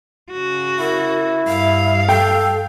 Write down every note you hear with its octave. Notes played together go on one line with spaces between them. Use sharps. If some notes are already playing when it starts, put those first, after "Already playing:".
C#3 F#4
E4 A#4
G2 E5 F5
A4 G5